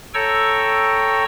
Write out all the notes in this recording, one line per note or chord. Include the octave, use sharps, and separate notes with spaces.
A4 C#5 G5 A#5 C#6 E6